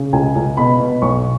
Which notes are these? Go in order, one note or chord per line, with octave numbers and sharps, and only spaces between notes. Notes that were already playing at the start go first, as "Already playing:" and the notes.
Already playing: C#3
C#2 G#5
C#2
B2 B5
B2
B1 C#6